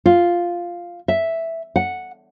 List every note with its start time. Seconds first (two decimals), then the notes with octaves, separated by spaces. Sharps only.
0.06 F4
1.08 E5
1.76 F#5